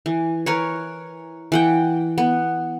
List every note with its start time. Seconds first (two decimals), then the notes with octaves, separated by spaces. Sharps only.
0.06 E3
0.46 A#4 B4 C#5
1.52 E3 F#5 G5
2.18 B3